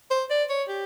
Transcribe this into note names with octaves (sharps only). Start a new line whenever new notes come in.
C5
D5
C#5
G4